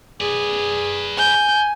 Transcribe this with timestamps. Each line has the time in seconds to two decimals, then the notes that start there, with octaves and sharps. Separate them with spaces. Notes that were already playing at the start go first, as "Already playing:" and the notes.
0.21 G#4 B4 D5
1.17 G#5 G6